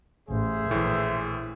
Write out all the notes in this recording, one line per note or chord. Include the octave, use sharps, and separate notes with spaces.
A1 G#4 C5 E5
A#1 A2 E3